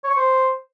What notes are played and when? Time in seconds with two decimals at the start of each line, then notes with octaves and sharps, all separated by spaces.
0.04 C#5
0.10 C#6
0.17 C5